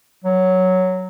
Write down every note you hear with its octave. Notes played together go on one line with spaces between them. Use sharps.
F#3